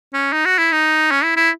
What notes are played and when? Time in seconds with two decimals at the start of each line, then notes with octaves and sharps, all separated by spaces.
0.13 C#4
0.33 D#4
0.46 F#4
0.58 E4
0.72 D#4
1.11 C#4
1.24 E4
1.36 E4